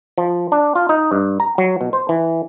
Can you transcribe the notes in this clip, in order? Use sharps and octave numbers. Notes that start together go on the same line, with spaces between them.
F3
D4
F4
D#4
G2
A#5
F#3
B2
C5
E3